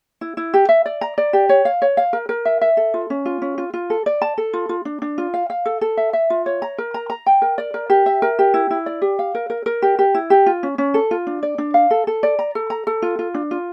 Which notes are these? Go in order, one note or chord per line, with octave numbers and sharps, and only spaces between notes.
E4
E4
G4
E5
D5
A#5
D5
G4
C#5
F5
C#5
F5
A#4
A#4
E5
E5
A4
F4
C#4
F4
C#4
F4
F4
A4
D5
A5
A4
F4
F4
D4
D4
F4
F5
F5
A4
A4
E5
E5
F4
C#5
A#5
A#4
A#5
A#5
G5
A#4
D5
A#4
G4
E5
A#4
G4
E4
E4
D5
G4
F5
A#4
A#4
A#4
G4
G4
E4
G4
F4
C#4
C#4
A4
F4
D4
D5
D4
F5
A4
A4
D5
A#5
A4
A#5
A4
F4
F4
D4
F4